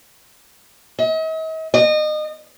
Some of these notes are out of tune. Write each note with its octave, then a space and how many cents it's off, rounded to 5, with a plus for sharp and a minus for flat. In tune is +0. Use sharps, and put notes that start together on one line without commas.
D#5 +45
D#5 -30